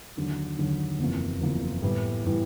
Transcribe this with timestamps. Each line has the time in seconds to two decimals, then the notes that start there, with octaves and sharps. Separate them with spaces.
0.17 D#2 D3 F#3
0.59 D#2 D3 F#3
0.99 F#1 E2 C3 F3 A#3
1.41 F#1 E2 C3 F3 A#3
1.82 A2 E3 G3 B3
2.25 A2 E3 G3 B3